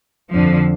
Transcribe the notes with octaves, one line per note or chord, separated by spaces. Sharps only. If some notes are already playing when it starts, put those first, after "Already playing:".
F2 D3 F3